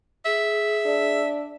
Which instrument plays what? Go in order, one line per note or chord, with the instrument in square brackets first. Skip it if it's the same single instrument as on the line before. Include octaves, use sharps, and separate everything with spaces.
[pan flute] G#4 [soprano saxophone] E5
[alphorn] D4